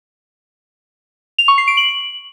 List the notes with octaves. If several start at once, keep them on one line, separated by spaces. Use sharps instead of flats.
F7
C#6
C7
D7
F#7